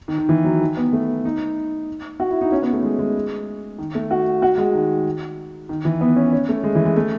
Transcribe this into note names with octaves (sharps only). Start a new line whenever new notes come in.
D#3
D#3
E3
F#3
D#3
B3
A3
D#4
F#4
E4
D#4
C#4
B3
A3
G#3
G#3
D#3
A3
F#4
F#4
G#3
D#3
D#3
E3
B3
C#4
C#4
A3
G#3
E3
G#3
A3